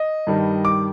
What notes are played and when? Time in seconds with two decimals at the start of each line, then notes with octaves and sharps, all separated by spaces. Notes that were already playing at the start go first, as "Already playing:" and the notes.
Already playing: D#5
0.27 G2 D#3 G3
0.65 D6